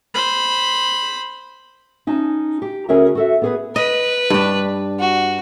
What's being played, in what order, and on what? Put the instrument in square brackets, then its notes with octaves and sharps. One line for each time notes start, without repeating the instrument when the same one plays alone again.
[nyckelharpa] C5 B5
[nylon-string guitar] C#4 D#4 A5
G4
D2 C#4 G#4 A#4 C#5 E5
F#4 A4 E5
B3 G#4 B4
[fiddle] B4 [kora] D#5
[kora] G2 D4
[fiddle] F#4